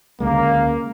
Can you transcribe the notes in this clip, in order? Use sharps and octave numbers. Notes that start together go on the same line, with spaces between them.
D2 C#3 G#3 A#3